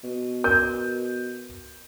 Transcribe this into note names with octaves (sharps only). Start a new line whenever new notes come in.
B2
A#4 G6